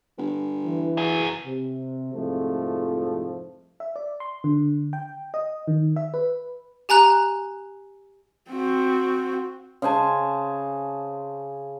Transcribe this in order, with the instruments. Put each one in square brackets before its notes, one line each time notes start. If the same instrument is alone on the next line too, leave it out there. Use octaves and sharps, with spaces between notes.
[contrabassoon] G1
[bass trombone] E3
[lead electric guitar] F#3 G#4
[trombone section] C3
C2 F2 G#2 F3 A3
[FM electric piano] E5
D5
C6
D3
G5
D#5
D#3
E5
B4
[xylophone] G4 G#5 A#5 F#6
[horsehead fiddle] C4 F#4
[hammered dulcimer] C#3 C5 G#5 A5